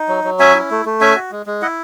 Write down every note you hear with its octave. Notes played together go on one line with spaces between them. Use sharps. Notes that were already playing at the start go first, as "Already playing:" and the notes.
Already playing: D#4
F#3
F#3
C#4 E5 G#5
E4
A3
A3
C#4 E5 G#5
F#4
G#3
G#3
E4 D#5 F#5